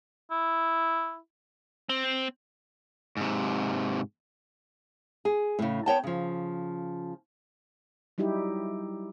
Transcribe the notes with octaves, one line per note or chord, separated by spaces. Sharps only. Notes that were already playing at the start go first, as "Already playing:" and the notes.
E4
C4
G#2 C3
G#4
A2 C#3
B3 C#5 G5 A5
C#3 F3
F#3 G3 D#4 E4 G4